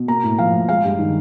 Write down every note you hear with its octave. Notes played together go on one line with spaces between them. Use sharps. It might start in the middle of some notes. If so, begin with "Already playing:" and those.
Already playing: B2
A#3 A#5
A2
F3 F5
A2
G#3 F5
G2
D#3